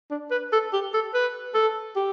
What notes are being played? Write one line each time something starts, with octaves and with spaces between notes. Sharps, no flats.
D4
B4
A4
G4
A4
B4
A4
G4